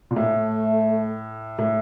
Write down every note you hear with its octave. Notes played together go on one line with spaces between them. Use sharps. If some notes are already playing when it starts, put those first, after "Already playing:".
A#2
A2 A3
A2